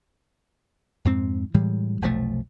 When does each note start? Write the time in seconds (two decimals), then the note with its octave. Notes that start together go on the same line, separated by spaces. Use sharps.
1.05 F2 G#2 C4
1.54 A2 E3 G3 G#3
2.01 F1 B1 F3 A3